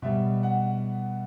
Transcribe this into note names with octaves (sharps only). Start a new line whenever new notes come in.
B2 G3 E5
F#5